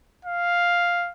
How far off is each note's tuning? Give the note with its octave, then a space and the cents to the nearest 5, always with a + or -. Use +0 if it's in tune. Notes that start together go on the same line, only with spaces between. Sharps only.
F5 +0